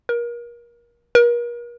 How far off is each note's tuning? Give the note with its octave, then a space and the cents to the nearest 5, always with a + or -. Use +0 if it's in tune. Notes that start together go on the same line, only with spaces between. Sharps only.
A#4 +30
A#4 +40